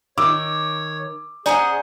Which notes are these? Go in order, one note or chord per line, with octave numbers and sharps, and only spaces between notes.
D#3 C#5 D6 E6
C#4 G#4 C5 D5 F#5 G#5 A#5